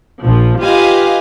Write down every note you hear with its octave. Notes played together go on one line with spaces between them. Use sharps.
A#1 F3
F4 G4 B4 D#5 F5 G#5